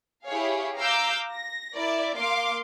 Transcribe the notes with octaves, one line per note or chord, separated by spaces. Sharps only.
E4 G4 G#4 C#5 F5
F5 A#5 D6 E6 G6
A#6
E4 A#4 D5
A#3 F5 C6 D6